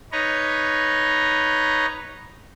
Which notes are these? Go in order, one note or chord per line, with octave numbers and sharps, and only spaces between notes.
D#4 B4 C#5 D#5 A#5